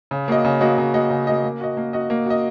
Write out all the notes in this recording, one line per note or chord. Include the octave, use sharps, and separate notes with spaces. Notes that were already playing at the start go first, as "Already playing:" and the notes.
C#3
A#3 F#4 D#5
C#3
A#3 F#4 D#5
C#3
A#3 F#4 D#5
C#3
A#3 F#4 D#5
A#3
F#4 D#5
A#3
F#4 D#5
A#3
F#4 D#5